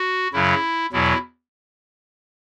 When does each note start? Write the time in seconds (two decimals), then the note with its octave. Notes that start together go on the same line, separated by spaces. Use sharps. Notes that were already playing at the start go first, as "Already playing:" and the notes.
Already playing: F#4
0.33 F#2 C#3 F#3 E4
0.92 E2 B2 F#3 E4